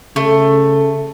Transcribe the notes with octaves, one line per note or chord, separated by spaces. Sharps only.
C#3 A3